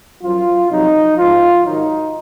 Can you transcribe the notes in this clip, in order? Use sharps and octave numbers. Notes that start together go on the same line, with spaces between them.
F#2 F3 F4
F2 C3 F#3 D#4
G#2 F3 F4
G#2 D#3 F#3 D#4